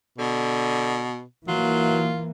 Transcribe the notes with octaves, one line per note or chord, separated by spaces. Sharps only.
B2 D3
E3 F#3 A#3 F4